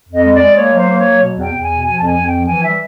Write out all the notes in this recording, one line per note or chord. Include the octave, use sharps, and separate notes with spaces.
F2
D#5
G#3
D5
G#3
A#3 C#5
F#3
C5
A#3
C#5
F#3
B2
E2 G5
E2
G#5
B2
F3 G#5
F2 A5
G#5
F2
G5
F3
E3 G#5
G3 E5